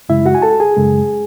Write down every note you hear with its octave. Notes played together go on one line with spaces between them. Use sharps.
F#2 C#3 G#3 E4 E5
F#4 F#5
G#5
A4 A5
G#4 G#5
F#2 C#3 G#3